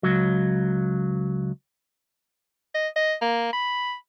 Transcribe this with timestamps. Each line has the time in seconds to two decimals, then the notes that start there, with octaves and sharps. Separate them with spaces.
0.03 C#2 F#3
2.75 D#5
2.96 D#5
3.22 A#3
3.53 B5